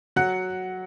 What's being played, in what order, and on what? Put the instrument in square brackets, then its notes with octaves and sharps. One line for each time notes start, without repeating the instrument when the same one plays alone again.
[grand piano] F#3 F#5 F#6